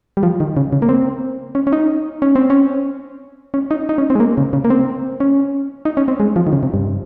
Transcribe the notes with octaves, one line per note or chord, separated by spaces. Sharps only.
G3
F3
D#3
C#3
C#3
A#3
C4
C#4
C#4
D#4
C#4
C4
C#4
C#4
D#4
D#4
C#4
C4
G#3
A#3
C#3
C#3
A#3
C4
C#4
D#4
C#4
C4
G#3
F3
D#3
C#3
C3
G2